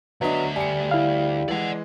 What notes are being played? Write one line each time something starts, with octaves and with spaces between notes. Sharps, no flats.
D2 F#3 B3 D4 D#5 E5
G3 G#5 C#7
E4 F5
E3 G#3 D5 F#5